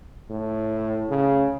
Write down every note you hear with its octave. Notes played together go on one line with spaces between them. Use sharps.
A2
C#3